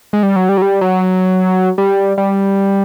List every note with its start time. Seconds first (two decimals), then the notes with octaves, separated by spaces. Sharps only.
0.13 G#3
0.23 G3
0.36 F#3
0.49 G3
0.57 F#3
0.62 G3
0.81 F#3
1.78 G3
2.18 G3